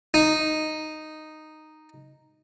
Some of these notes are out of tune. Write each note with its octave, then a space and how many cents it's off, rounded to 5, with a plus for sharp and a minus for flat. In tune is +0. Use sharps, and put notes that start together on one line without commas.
D#4 -5